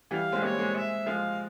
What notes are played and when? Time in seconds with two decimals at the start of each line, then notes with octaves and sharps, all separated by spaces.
0.11 E3 G3 F5
0.33 G#3 C4
0.43 G3 A#3 C#5
0.58 G#3 C4
0.75 E5
1.06 F3 G#3 F5